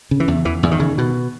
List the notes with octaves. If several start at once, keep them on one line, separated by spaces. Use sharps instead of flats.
C#3
E3
E2
E2 E3
E2
D#3
C#3
B2